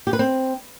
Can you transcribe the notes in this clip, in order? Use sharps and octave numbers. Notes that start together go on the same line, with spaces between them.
G4
B4
C4